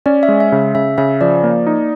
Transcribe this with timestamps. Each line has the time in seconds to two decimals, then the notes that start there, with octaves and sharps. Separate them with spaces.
0.06 C#4 D5
0.23 E5
0.28 G#3
0.40 E5
0.52 C#3
0.75 C#3 E5
0.98 C#3 E5
1.21 F3 D5
1.43 A#3
1.67 D#4